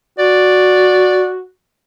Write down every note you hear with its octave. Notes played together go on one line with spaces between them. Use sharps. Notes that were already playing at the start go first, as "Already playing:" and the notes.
F#4 D5